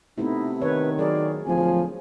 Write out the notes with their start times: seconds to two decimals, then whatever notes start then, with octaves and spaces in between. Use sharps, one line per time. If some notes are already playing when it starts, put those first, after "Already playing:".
0.18 C3 A3 B3 D#4 E4
0.62 D#3 B4 C#5
0.98 F#3 G#4 A#4 D5
1.46 D1 F3 G#5